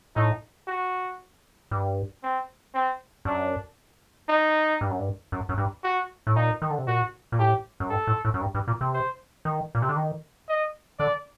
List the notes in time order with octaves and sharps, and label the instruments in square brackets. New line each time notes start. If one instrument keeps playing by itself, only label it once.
[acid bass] A2 [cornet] D#4
[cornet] F#4
[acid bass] G2
[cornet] C4
C4
[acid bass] F#2 [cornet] D4
[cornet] D#4
[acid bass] G2
F#2
G2
F#2
F#2
G2
[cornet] F#4
[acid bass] A2
[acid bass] A#2 [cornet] D#4
[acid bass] D#3
D3
C3
[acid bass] A#2 [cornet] F#4
[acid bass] A#2
[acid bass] A2 [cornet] G4
[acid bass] F#2
[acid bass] G2 [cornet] A4
[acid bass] A2
A2
F#2
G2
G2
A#2
C3
[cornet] C5
[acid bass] D#3
A#2
C3
D3
D#3
[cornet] D#5
[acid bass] D3 [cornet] D5